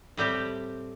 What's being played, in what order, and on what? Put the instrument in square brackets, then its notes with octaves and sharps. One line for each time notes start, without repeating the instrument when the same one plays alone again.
[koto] A2 G3 C4 G4